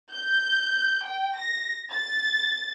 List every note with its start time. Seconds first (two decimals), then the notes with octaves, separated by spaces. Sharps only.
0.12 G6
1.05 G5
1.36 A#6
1.91 A6